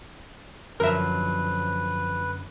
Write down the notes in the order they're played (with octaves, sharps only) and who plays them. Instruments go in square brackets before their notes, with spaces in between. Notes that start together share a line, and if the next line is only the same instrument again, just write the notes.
[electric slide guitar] F#2 D3 F#3 [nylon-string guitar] F3 [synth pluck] A#4 E5 [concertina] B4